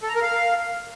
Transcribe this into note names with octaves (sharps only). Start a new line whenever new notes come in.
A4
A#5
A#4
F5